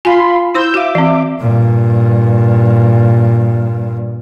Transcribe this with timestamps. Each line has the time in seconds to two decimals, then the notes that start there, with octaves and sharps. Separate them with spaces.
0.05 F4 F5 G#5 B5 C6
0.55 E4 C5 C6 E6 G6
0.74 F#4 E5 F5 D6
0.95 E3 C4
1.41 G2 A#2